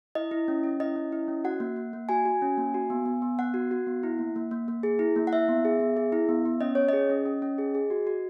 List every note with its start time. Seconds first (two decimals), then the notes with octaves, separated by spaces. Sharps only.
0.15 E4 D#5
0.31 E4
0.48 C#4
0.64 C#4
0.80 E4 D#5
0.96 C#4
1.12 E4
1.28 C#4
1.44 F#4 F#5
1.60 A#3
1.76 A#3
1.93 A#3
2.09 F#4 G#5
2.25 F#4
2.42 C#4
2.58 A#3
2.74 F#4
2.90 B3
3.06 B3
3.22 B3
3.39 B3 F#5
3.54 F#4
3.71 F#4
3.87 B3
4.03 E4
4.19 A#3
4.36 A#3
4.51 A#3
4.68 A#3
4.83 G#4
4.99 E4
5.16 A#3
5.27 F#5
5.32 E4 E5
5.49 B3
5.65 G#4
5.80 B3
5.97 G#4
6.12 E4
6.29 B3
6.46 B3
6.61 C#4 D#5
6.75 C#4 C#5
6.89 G#4 D#5
7.10 C#4
7.26 C#4
7.42 C#4
7.58 G#4
7.75 G#4
7.90 F#4
8.07 F#4